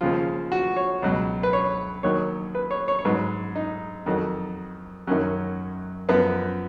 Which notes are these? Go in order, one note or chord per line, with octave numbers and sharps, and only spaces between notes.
D#2 C#3 F3 F4
F#4
C#5
C#2 B2 F#3
B4
C#5
D#2 D#3 F#3 C#5
B4
C#5
C#5
C#5
G#2 F#3 B4
D#4
F2 D#3 F#3
F#2 D#3 F#3 C#4
F#2 F3 B3